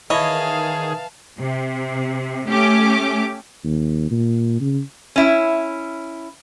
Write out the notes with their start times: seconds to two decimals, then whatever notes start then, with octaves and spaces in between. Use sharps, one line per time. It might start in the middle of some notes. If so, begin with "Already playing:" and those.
0.10 D#3 E3 G#4 C#5 D#5 F5 A5 C#6
1.39 C3
2.47 A3 C#4 G4 D6
3.64 D#2
4.11 A#2
4.61 C#3
5.16 C#4 E4